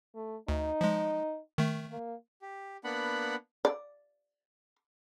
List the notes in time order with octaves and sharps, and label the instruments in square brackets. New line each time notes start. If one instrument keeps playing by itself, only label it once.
[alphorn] A3
[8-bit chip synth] D2 [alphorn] D#4
[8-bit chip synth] F3 G#3
D#3 A3
[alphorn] A#3
[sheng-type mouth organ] G4
A#3 B3 D4 F#5 B5
[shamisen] D5